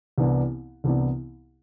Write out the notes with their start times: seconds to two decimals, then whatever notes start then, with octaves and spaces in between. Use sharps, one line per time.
0.18 C2 C3 E3 B3 D4
0.84 C2 C3 E3 B3 D4